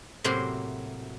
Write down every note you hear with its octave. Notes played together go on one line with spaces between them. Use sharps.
A2 C3 F#3 A#3 C5 C6